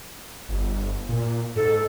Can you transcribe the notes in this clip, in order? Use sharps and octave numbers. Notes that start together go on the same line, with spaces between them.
G1
A#2
G#2 A4